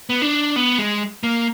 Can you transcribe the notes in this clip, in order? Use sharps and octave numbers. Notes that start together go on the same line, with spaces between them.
B3
D4
B3
G#3
A#3